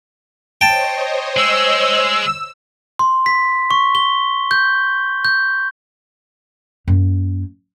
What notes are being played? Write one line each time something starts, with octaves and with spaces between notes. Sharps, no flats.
C5 C#5 D#5 G5 A5
G#3 E6
C6
B6
C#6
G7
G6
G6
F#2 A#3